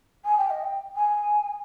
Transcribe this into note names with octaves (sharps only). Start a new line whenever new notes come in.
G#5
G5
D#5
G5
G#5